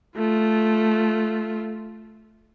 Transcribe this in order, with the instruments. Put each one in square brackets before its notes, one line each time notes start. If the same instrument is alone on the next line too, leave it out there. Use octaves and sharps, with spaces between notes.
[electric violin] A3 F4